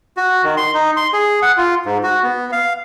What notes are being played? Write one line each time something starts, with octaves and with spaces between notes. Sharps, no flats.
F#4
D#3
C6
D#4
C6
G#4
F#5
F4
G#2
F#4
B3
F5